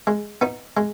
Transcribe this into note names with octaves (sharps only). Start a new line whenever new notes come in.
G#3
B3 D#4
G#3